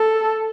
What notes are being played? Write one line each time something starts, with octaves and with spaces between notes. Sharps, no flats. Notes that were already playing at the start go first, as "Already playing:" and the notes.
Already playing: A4